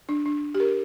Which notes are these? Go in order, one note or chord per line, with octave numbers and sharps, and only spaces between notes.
D4
D4
G4
A#4